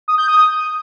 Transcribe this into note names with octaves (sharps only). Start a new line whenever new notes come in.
D#6
G6
D#6